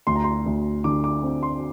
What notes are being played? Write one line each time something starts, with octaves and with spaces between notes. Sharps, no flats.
D2 C6
A#5
C6
D2
D3 D6
D6
C4
C6